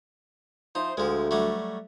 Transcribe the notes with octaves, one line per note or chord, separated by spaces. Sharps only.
F3 D#4 E4 C5
D2 F3 G#3
F#3 G3 A3